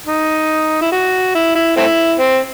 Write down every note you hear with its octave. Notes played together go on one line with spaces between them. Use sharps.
D#4
E4
F#4
E4
E4
A3 C4 E4
C4